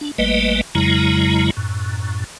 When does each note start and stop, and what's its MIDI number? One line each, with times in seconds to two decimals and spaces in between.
0.01 0.11 62
0.18 0.61 32
0.18 0.61 55
0.18 0.61 57
0.18 0.61 58
0.18 0.61 71
0.18 0.61 75
0.75 1.50 41
0.75 1.50 49
0.75 1.50 54
0.75 1.50 56
0.75 1.50 64
0.75 1.50 82
1.57 2.24 42
1.57 2.24 45